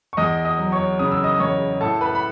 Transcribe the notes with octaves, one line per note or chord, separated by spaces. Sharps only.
C#6
E2 D#5 D#6
D#5 D#6
F#3
C#5 C#6
C#3 D#6
E6
D#5 D#6
D#6
E2 C#5 C#6
A2 A4 A5
B4 B5
B5